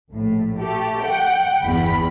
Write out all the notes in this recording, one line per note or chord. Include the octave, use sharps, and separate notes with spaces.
A#1 A2
A3 G4
F#5 G5
G1 E2 B5